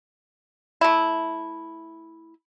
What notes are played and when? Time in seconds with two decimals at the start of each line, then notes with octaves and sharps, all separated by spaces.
0.81 A3 E4